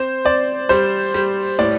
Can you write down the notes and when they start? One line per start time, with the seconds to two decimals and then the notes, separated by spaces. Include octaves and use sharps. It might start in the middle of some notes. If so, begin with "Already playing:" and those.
Already playing: C4 C5
0.25 C4 D5
0.69 G3 C5
1.14 G3
1.59 A2 D5